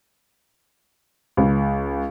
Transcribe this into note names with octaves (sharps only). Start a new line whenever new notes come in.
C#2